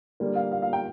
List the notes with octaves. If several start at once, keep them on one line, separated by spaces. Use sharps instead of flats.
D3 G3 A#3
F5
F5
F5
G5